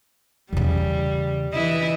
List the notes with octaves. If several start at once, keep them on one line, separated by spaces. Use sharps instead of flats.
E2 C#3 G3
E3 E4 D#5